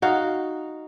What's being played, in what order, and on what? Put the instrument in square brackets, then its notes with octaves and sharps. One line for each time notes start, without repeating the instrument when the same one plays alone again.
[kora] D#4 F#4 F5